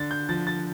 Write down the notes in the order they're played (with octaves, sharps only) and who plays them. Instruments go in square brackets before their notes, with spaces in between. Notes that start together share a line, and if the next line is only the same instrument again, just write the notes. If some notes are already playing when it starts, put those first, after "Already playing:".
Already playing: [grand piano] D3 A6
G6
F3 A6
A6